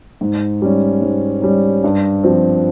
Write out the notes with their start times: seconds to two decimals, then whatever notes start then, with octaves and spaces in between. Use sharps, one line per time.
0.21 G#2
0.62 G3 C#4
1.02 G#2
1.42 G3 C#4
1.84 G2
2.23 F3 C4